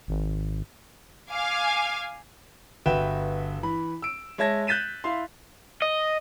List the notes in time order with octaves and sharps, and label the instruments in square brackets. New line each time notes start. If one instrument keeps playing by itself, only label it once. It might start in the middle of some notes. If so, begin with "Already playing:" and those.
[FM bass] G#1
[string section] F5 G#5 D6
[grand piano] G1 F#4 B4 E5 G5 E7
E3 B5
E6 D7
G#3 C#5 E5 A5 G#6 A#6
F#6 G6 A6 B6 D#7 E7
E4 E5 F5 C6
[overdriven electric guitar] D#5